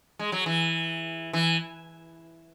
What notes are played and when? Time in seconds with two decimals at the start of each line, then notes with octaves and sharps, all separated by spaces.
0.19 G#3
0.32 F#3
0.46 E3
1.33 E3